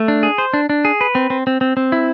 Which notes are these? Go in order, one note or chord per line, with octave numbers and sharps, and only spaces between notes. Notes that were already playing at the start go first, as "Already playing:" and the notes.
Already playing: A3
D4
G#4
C5
D4
D4
G#4
B4
C4
C4
C4
C4
C4
E4